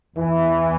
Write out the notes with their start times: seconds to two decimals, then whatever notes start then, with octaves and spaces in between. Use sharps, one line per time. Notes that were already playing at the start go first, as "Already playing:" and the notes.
0.17 E2 E3